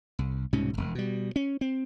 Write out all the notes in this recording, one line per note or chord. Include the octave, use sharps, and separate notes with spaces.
C2
C2 G#2 B2 C#4
E1 A#1
B2 G3
C#4
C4